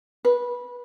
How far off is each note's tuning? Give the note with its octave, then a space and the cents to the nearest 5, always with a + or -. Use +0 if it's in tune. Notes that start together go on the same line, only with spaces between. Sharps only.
B4 -15